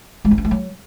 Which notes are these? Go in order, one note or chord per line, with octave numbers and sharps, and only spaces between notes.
G#3
B3
C4
A3
F#3